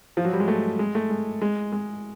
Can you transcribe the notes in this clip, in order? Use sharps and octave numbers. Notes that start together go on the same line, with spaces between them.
F3
F#3
G3
G#3
A3
G#3
A3
G#3
G#3
G#3